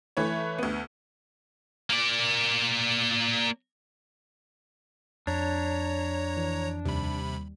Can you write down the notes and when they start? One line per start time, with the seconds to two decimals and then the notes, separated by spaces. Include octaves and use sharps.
0.17 E3 A3 B4 C#5
0.58 D2 B3
1.90 A#3 D5
5.27 F2 D4 C#5 A#5
6.37 E3
6.85 D#2 C3 G3 B5